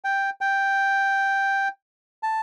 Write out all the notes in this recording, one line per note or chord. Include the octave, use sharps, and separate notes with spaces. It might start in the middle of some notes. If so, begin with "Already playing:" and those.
G5
G5
A5